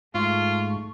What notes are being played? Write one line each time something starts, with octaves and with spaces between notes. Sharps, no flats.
G#2 A3 F4 C#6